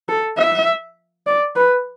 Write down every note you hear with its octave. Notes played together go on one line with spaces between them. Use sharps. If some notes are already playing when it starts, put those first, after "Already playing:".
A4
E5
D5
B4